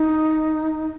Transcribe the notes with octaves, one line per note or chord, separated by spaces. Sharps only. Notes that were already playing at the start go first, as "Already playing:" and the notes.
Already playing: D#4